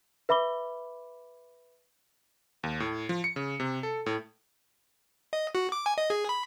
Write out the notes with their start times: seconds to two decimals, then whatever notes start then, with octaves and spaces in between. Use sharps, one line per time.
0.29 B4 E5 B5 D6 G7
2.63 D#2
2.80 A2
3.09 F3
3.24 C#7
3.36 C#3
3.60 C3
3.83 A4
4.06 A2
5.33 D#5
5.55 F#4
5.72 D6
5.86 G#5
5.98 D#5
6.10 G#4
6.29 B5